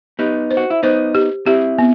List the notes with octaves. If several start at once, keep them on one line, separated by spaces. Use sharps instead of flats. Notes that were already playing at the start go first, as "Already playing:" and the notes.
B3 D#4 G4
C5
F#4
E4
B3 D#4 C5
G4
C4 E4 G4
B3